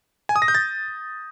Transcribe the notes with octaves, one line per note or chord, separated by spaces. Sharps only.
G#5
D#6
A#6
G6
A6